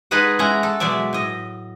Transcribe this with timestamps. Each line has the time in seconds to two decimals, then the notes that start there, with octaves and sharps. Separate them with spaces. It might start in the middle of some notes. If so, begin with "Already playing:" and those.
0.11 G#3 D#4 G#4 B4 D#5 F#5
0.39 G#3 C#4 E4 F#5 A#5
0.63 A4
0.80 B2 F#3 G#3 D5 E5
1.13 A2 D#5